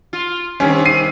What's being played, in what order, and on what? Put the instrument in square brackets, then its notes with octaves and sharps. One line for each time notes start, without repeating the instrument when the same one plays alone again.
[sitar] F4
[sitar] G2 C3 D#3 [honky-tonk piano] C#4
[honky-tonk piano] C7 D#7